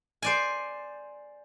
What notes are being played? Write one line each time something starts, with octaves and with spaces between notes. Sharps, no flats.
C5 D5 G#5